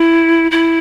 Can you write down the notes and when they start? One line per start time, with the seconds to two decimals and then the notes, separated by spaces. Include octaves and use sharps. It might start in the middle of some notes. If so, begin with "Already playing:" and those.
Already playing: E4
0.51 E4